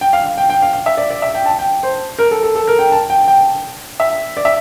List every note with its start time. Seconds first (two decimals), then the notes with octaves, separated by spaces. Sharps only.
0.01 G5
0.13 F5
0.26 F5
0.37 G5
0.50 G5
0.62 F5
0.73 F5
0.86 E5
0.97 D5
1.10 D5
1.22 E5
1.35 G5
1.46 A5
1.59 G5
1.83 C5
2.19 A#4
2.31 A4
2.43 A4
2.55 A4
2.67 A#4
2.79 G5
2.92 A5
3.10 G5
3.28 G5
4.00 E5
4.37 D5
4.45 E5